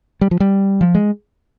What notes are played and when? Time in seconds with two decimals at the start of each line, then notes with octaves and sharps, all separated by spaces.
0.21 G3
0.31 F3
0.40 G3
0.81 F3
0.95 G#3